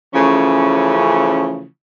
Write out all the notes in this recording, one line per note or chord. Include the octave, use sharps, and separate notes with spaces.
C#3 E3 F3 A3 C#4